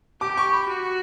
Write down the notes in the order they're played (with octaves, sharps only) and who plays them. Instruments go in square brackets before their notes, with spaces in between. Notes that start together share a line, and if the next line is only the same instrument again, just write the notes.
[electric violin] G4 [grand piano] D6
[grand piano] C#6
B5
[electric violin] F#4